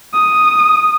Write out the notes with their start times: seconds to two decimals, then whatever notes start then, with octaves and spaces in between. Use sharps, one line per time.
0.14 D#6